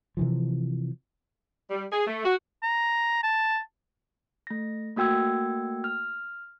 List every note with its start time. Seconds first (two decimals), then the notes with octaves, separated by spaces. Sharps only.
0.17 C3 E3 F3
1.70 G3
1.92 G#4
2.07 A3
2.25 F#4
2.63 A#5
3.23 A5
4.47 A3 A#6
4.96 A3 A#3 F#4 G5 E6 G#6
5.84 F6